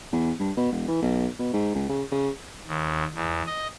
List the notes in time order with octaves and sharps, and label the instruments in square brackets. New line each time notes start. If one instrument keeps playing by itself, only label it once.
[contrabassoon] E2
G2
B2
E1
E3
B1
B2
G#2
C#2
C#3
C#3
[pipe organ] D#2
E2
D#5